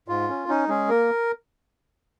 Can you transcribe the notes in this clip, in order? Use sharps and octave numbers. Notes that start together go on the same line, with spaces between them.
G#2 F4
C#4
C#4 D#4
G#3 C#4 G#4
A#3 A#4